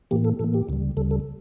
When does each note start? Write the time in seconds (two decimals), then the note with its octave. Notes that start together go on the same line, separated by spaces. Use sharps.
0.11 A2 E3 A#3 G4
0.25 A4
0.39 A2 E3 A#3 A4
0.54 G4
0.69 D2 C#3 G3
0.97 D2 C#3 G3 A4
1.11 A4